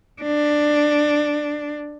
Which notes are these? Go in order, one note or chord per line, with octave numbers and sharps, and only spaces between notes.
D4